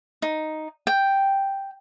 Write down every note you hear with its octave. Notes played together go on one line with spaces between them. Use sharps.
D#4
G5